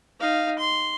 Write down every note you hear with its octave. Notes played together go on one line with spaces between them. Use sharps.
D#4 F5
C6